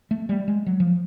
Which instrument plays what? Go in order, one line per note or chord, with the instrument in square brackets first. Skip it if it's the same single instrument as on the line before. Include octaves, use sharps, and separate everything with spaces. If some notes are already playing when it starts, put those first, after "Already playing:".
[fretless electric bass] A3
G3
G#3
F#3
F3